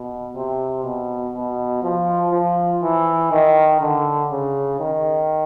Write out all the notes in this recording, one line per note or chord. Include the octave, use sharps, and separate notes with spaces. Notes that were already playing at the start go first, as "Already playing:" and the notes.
Already playing: B2
C3
B2
B2
F3
F3
E3
D#3
D3
C#3
D#3